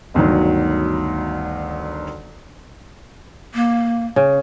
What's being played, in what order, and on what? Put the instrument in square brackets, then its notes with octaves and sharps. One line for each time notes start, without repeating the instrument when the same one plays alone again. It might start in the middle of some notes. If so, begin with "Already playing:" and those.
[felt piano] G1 D2 D#3 F#3
[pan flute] A#3
[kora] C#3